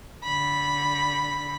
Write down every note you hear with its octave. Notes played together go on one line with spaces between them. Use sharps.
D3 B5